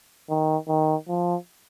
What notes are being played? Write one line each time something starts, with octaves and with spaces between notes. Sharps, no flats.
D#3
D#3
F3